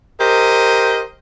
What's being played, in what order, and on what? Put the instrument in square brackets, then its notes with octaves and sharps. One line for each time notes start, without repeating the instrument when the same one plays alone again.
[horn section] G4 A#4 C5 D#5